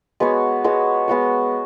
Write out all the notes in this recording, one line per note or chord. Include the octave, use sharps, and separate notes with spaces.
G#3 B3 F#4 C#5
G#3 B3 F#4 C#5
G#3 B3 F#4 C#5